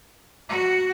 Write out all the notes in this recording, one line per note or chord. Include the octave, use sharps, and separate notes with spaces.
F#4